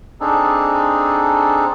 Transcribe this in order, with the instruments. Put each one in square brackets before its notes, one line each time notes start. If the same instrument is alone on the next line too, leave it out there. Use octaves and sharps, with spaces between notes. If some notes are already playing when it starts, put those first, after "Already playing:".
[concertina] C4 D4 D#4 G#4 A4